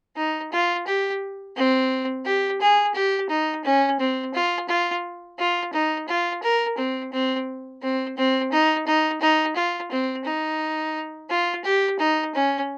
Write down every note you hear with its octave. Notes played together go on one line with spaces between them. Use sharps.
D#4
F4
G4
C4
G4
G#4
G4
D#4
C#4
C4
F4
F4
F4
D#4
F4
A#4
C4
C4
C4
C4
D#4
D#4
D#4
F4
C4
D#4
F4
G4
D#4
C#4